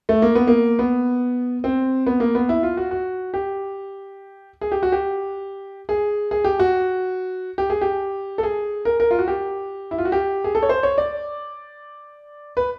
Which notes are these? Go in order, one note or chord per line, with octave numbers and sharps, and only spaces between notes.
A3
A#3
B3
A#3
B3
C4
B3
A#3
B3
E4
F4
F#4
F#4
G4
G#4
G4
F#4
G4
G#4
G#4
G4
F#4
G4
G#4
G4
A4
G#4
A#4
A#4
F4
F#4
G4
E4
F4
F#4
G4
G#4
A4
C#5
C5
C#5
D5
B4